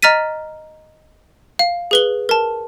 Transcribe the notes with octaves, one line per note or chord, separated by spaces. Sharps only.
D#5 A#5 F6 A6 B6 D#7
F5
G#4 B4 G7
A#4 A5